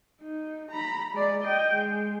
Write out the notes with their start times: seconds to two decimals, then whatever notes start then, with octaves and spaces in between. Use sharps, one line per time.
0.21 D#4
0.71 A#5 B5
1.14 G#3 D5
1.43 D#5 G5
1.73 G#3